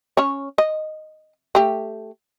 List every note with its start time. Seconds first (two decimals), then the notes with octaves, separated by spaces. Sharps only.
0.17 C#4 C#5
0.58 D#5
1.55 A3 G4